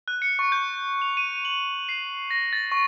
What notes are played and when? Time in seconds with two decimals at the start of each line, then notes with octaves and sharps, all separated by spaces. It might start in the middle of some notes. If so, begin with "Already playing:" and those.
0.08 F#6
0.22 C#7
0.39 C#6
0.52 G6
1.02 F7
1.17 D#7
1.45 F#7
1.89 C7
2.31 A#6
2.53 A6
2.72 C#6